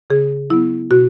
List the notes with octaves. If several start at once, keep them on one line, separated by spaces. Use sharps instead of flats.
C#3 G#4
F#3 B3 E4
B2 F#4